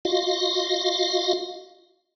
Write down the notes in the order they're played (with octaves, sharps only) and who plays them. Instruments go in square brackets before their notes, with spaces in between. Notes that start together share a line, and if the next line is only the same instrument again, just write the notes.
[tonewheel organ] F4 F#4 D#5 F5